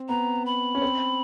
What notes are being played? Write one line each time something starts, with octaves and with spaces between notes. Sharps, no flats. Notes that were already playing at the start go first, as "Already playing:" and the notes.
Already playing: C4
B3 A#5
B5
C#4
C4